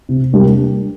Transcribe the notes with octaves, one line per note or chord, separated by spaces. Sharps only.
C3
G3 A#3 D4 G4